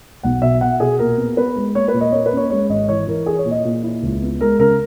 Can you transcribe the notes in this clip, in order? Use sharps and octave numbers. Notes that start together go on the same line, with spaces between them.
B1 F#5
B2 E5
B2 F#5
B2 G#4
A#2 A#4
B3
B3 B4
G#3
A#3 C#5
B4
A#2
D#5
A#3 C#5
B4
C#4 C#5
G#3 C#5
G#1 D#5
E3 C#5
E3 A#4
E4 G#4
C#5
A#2
D#5
A#2
E4
C#2
B3
G#3 A#4
C#3 A#4